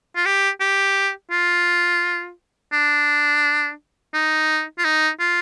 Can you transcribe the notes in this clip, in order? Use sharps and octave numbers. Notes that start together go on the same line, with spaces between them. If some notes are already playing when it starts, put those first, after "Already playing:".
F4
G4
G4
F4
D4
D#4
F4
D#4
F4